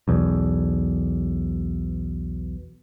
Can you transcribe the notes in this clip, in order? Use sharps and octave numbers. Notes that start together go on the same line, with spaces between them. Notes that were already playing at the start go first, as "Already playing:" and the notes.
B1 E2